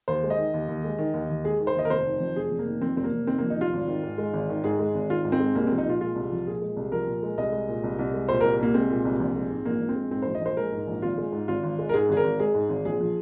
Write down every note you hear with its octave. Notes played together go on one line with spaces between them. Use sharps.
D#2 C5
G#3
D#5
D#3
D#2
D#2
G#3
D#3
D#2
D#2
G#3 G#4
D#3
C5
D#2 D#5
A#4
F1 C5
D#3
F2
F1 G#4
F1
A#3
D#3
F2 C4
F1 C4
A#3
F1
D#3 C4
F2 A#3
D#4
F1 F4
G#1
D#3
G#2
G#3
G#1
D#3
G#2 G#4
G#3
G#1
D#3 F4
G#2
C4
G#3
C2 A#3
F3 C4
D#4
A#2 F4
G#3 F4
C2
F3
A#2 G#4
G#3
C2
F3 A#4
A#2
G#3
C2 D#5
G#3
A#2
C2
C2
G#3
A#2 C5
C2 A#4
C2 A#3
G#3 C4
A#2
C2
A#1
G#3
G#2
A#1 A#3
A#1
C4
G#3
G#2 C4
A#1 C5
D#5
A#1 C5
G#3 A#4
G#2
A#1
G#1 F4
G#3
G#2
G#1 F4
G#1
G#3
A#4
G#2 G#4
G#1 G#4
A#4
G#1
G#3 G#4
G#2
G#1
A#1 G#4
F3